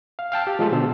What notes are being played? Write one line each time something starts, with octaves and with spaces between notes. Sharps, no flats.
F5
F5 G5 A5 E6
G4
F3 G#3 F4 A4 C6
B2 D3 C5 E6